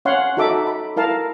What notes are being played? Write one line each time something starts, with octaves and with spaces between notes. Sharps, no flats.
C#4 C#5 F5 F#5 C6
D#4 F#4 A4 E5 D6
B5
E4 A#4 F5 A5